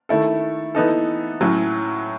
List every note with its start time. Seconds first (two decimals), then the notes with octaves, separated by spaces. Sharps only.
0.09 D#3 A3 E4 A4
0.75 E3 B3 D#4 A4
1.41 A2 F#3 C#4